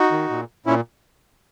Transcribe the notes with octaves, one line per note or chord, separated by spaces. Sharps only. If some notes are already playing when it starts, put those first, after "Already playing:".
Already playing: D#4 F#4
D#3
A#2
A#2 C#4 E4